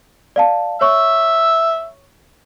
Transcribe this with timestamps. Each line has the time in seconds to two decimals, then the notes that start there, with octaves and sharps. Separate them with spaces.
0.36 D5 F5 A5
0.81 C#5 E5 C#6